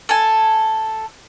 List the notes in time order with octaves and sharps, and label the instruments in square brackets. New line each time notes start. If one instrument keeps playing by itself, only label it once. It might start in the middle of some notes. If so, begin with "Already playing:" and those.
[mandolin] A4 G#5